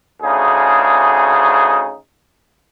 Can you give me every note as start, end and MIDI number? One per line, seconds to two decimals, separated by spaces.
0.22 1.94 38
0.22 1.94 49
0.22 1.94 63
0.22 1.94 68